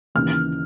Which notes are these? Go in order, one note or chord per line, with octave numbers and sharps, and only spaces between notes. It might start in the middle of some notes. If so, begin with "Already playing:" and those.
D#2 C#3 E3 F6